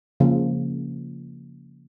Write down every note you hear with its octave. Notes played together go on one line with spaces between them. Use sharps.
C#3 F3 A#3